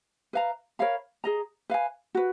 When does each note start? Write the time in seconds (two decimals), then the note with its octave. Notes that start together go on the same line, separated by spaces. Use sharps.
0.33 B4 F5 A#5
0.79 A#4 C#5 F5 B5
1.24 G#4 D#5 A#5
1.70 B4 F5 G#5
2.15 F#4 B4